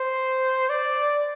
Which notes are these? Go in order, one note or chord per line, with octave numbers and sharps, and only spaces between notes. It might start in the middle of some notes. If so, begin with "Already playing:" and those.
Already playing: C5
D5